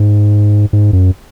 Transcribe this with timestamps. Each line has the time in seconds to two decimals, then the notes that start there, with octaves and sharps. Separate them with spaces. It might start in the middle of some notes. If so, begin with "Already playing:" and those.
Already playing: G#2
0.73 G#2
0.93 F#2